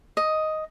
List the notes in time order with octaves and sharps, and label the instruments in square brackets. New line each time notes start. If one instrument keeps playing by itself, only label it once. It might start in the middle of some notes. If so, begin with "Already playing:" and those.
[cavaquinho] D#5